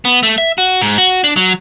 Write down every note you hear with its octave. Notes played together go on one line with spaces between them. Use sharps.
B3
A3
E5
F#4
G#2
F#4
D4
F#3